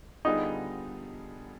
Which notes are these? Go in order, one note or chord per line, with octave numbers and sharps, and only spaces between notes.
D3 G3 B3 D#4 F4 G#4